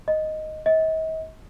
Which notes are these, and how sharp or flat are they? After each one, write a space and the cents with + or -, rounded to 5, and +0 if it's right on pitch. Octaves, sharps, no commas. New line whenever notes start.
D#5 +0
D#5 +40